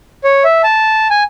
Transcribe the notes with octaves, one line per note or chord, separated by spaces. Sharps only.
C#5
E5
A5
G#5